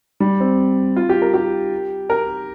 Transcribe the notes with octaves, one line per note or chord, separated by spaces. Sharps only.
G3
C4
F4
G4
A#4
G4
A#4